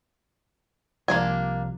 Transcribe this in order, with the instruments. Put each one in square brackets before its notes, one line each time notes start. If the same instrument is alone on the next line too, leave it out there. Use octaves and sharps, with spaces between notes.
[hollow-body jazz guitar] C2 F3 [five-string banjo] A#3 D4 G#5